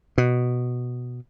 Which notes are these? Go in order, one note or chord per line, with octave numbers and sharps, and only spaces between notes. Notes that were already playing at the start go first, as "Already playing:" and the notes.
B2